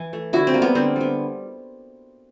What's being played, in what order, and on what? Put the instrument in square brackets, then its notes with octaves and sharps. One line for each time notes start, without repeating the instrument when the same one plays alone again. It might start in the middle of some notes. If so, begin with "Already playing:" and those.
Already playing: [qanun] E3
A3
D3 E4 F#4
C4
G3 A#3
B3
D3 C4
G3 B3